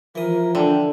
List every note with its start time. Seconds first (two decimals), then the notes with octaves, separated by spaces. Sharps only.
0.15 E3 F3 A#4 D#6
0.55 D3 G5